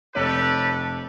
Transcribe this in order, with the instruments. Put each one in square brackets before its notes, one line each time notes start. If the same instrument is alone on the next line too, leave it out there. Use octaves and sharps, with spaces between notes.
[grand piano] F1 C#5 [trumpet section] G4 A4 B4